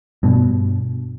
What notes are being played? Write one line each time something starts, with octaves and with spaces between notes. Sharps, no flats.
G2 B2